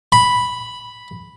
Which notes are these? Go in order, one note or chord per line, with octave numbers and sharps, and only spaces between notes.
B5